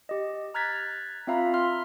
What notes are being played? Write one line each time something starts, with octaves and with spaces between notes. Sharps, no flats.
G4 D#5
A#5 F6 F#6 G#6 A6 B6
C4 F4 E5 F5 A#5 B5
E5 C6 F6